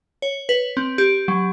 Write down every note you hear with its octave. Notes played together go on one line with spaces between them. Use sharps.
C#5
B4
C4
G4
F#3